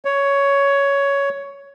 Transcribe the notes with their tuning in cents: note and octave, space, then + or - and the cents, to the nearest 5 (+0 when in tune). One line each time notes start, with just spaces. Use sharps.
C#5 +10